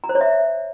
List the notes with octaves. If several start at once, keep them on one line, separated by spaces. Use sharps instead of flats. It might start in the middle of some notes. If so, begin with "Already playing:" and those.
A#5
C5
C#5
E5